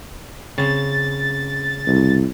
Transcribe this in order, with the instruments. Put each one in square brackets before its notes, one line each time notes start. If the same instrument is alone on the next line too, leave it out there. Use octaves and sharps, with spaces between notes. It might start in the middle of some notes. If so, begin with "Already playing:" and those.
[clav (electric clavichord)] C#3 C4 [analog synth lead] A6
[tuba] C2